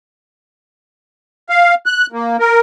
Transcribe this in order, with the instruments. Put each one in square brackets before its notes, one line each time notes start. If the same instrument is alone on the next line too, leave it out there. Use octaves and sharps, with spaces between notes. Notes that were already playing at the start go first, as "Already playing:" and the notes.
[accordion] F5
F#6
A#3
A#4